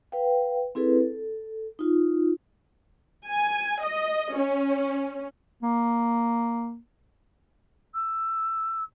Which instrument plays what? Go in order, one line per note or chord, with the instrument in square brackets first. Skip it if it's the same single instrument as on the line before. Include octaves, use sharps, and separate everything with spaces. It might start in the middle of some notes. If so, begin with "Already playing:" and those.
[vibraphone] B4 F5 G5
C4 E4 G#4 A4 B4
A4
D#4 F4
[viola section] G#5
D#5
C#4
[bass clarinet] A#3
[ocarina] E6